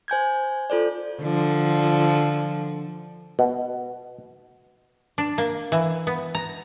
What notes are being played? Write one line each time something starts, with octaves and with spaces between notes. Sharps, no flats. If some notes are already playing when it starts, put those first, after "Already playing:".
C5 G#5 G6 G#6
F4 A4 C5 D5
D3 F3
B2
D4
A#3
E3
B3
A#5